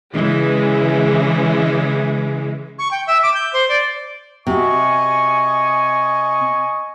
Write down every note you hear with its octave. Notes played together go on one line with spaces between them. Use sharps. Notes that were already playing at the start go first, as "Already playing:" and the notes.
C#3 E3 G#3
C#6
G5
E5
D6
G6
C5
D5
C3 F#4 D#5 G#5 C#6